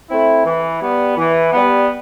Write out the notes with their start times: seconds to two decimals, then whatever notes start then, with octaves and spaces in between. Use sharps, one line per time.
0.10 A3 C4 E4
0.46 E3
0.82 G3 B3
1.18 E3
1.53 G3 B3